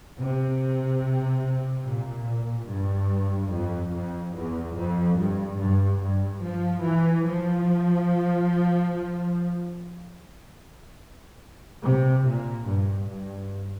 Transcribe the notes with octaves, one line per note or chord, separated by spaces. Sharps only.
C3
A#2
G2
F2
F2
E2
F2
G2
G2
G2
F3
E3
F3
C3
A#2
G2
G2